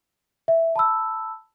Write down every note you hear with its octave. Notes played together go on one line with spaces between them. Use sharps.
E5
A5 B5 E6